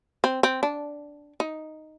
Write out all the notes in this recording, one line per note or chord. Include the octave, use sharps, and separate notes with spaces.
C4
C4
D4
D#4